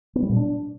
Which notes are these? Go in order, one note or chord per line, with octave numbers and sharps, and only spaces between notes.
B3
G3
A#2
D4